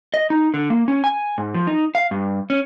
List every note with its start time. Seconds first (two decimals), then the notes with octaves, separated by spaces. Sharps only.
0.14 D#5
0.30 D#4
0.54 D3
0.70 A#3
0.88 C#4
1.04 G#5
1.38 G#2
1.54 F3
1.67 D#4
1.95 F5
2.11 G2
2.50 C#4